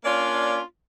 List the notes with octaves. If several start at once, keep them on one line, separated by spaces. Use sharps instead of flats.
A#3 C#4 D4 F4 C#5 D5